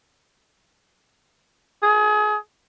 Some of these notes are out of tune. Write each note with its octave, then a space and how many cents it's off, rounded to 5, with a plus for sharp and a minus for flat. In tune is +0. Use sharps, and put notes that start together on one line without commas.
G#4 +30